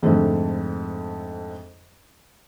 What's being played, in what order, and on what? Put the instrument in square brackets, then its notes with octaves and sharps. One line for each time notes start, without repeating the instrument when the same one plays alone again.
[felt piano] F2 G#2 D3 F3 A3